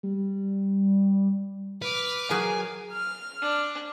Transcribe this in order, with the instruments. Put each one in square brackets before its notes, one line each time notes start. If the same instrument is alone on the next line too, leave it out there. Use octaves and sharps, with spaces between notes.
[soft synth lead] G3
[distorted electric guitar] B4 [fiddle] D6 F6
[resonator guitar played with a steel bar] F#3 G#4 A#4 [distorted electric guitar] G#5
[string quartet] F6
[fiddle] D4